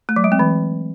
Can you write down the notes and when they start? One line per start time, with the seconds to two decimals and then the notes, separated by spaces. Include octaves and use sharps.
0.09 A3
0.16 F#3
0.24 G#3
0.32 C4
0.39 E3